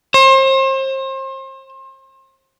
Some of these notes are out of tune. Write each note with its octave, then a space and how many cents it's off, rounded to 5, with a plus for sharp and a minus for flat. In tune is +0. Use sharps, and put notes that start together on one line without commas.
C5 +35